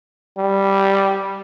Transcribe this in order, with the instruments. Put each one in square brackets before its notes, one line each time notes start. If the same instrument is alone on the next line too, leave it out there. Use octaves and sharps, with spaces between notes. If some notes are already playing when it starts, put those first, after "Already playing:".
[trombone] G3